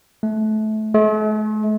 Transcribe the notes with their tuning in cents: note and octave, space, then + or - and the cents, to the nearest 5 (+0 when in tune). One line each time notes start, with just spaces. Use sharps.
A3 -25
A3 -45